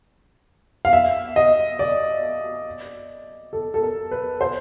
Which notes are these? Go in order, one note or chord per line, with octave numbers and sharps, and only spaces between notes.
F5
E5
D#5
D5
A4
A4
A#4
B4
C5